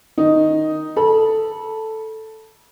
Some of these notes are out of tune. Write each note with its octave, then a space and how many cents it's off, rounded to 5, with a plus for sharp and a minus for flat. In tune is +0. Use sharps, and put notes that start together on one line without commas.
D#3 +0 D#4 +0
A4 +0 B5 -30